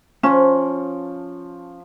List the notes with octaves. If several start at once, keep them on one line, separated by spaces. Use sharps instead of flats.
F3 C#4 C#6